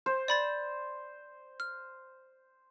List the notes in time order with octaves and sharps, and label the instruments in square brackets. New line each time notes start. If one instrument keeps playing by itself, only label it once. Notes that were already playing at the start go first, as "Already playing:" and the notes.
[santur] C5
[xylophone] D5 B5 A6
F6